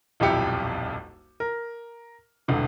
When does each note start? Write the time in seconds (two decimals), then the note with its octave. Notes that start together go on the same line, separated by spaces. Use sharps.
0.20 D#1 B1 F2 E4 G4 C#7
1.40 A#4
2.48 E1 C2 D3